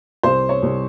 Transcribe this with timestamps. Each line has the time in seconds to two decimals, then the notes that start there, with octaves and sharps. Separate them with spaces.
0.23 C2 C5
0.49 C#5
0.62 C2